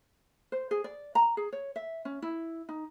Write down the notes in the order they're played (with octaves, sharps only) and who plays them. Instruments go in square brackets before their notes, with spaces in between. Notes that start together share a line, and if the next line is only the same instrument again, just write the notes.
[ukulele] C5
G#4
D5
A#5
G#4
C#5
E5
C#4
E4
D#4